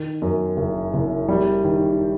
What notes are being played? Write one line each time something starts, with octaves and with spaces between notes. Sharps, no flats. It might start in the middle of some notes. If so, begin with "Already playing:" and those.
Already playing: D#3
F#2
F#1
F#1
G3
D#3